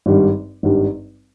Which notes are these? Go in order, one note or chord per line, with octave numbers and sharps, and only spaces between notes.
G#1 G2 G3
G#1 G2 G3